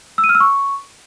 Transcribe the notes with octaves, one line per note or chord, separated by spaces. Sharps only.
E6
D#7
F6
E6
C#6